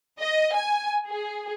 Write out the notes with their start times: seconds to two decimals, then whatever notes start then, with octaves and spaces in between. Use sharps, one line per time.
0.20 D#5
0.54 G#5
1.09 G#4